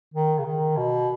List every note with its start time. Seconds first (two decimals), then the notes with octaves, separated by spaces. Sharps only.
0.14 D#3
0.38 C#3
0.45 D#3
0.77 B2